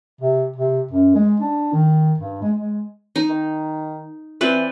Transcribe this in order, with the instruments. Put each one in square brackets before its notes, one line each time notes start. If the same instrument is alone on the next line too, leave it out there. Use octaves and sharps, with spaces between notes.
[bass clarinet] C3
C3
F#2
G#3
D4
D#3
G2
G#3
G#3
[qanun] D#4
[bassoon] D#3
[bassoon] E3 [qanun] C4 B4 D5